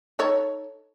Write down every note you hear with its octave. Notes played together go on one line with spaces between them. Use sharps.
D#4 A4 C#5